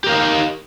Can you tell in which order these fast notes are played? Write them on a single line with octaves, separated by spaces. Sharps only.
G4 A#4 F5 D#4